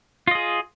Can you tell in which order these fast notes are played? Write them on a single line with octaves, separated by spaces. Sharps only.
F4 D#5 G#4